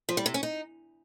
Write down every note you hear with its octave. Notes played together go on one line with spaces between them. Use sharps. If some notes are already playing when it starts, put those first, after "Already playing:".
F3
G3
C3
C#4
D#4